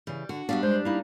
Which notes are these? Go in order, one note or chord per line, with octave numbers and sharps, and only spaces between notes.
C#3 E3 G3
D3 F#4
G2 G3 B3 D4 F#4 E5 F5
G#3 C5
A#3 D#4 E4